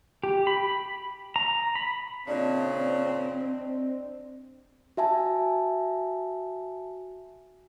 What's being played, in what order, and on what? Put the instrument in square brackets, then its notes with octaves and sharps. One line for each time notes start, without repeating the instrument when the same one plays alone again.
[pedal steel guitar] G4
B5
A#5
B5
[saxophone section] A#2 C#3 [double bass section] C4 [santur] D4 D#5
[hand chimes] F#4 E5 G#5 A5